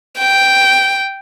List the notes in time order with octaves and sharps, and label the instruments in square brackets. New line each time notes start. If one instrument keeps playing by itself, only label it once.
[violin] G5